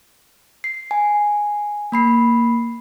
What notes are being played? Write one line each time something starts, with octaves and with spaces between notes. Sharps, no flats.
C7
G#5
A#3 B5 C7